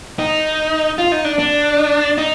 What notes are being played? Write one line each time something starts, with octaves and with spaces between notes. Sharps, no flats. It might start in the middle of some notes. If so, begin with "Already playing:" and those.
D#4
F4
D#4
D4
D4
D#4